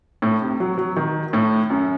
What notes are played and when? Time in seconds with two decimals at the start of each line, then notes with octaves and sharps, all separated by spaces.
0.22 A2
0.42 C3
0.60 F#3
0.78 F#3
0.96 D#3
1.33 A2
1.70 F#2